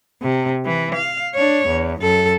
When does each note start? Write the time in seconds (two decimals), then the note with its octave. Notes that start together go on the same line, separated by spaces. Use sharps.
0.22 C3
0.65 E3
0.94 F5
1.35 D4 C#5
1.68 E2
2.01 F#2 A4